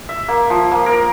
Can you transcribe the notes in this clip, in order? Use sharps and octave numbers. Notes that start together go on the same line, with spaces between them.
E5
A#3
F3
A#3
A#4